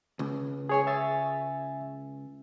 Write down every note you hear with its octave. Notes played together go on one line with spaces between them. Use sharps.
C#2
G#4 C#5 G#5
E5 G#5 A6